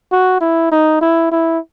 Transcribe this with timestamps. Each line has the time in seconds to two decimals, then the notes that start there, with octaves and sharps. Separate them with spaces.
0.12 F#4
0.41 E4
0.72 D#4
1.01 E4
1.32 E4